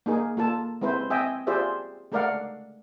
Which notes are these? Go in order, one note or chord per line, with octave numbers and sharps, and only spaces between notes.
A#3 D#4 G#4 A#4
A#3 F4 A4 A5
G#3 C4 E4 B4 C5
C4 D#5 E5 G5 G#5
F4 G4 G#4 C5 D5 E5
G#3 A3 A#4 D5 F5 F#5